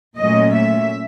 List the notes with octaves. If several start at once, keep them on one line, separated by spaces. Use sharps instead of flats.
A#2 F#3 A3 C#4 D#5
E5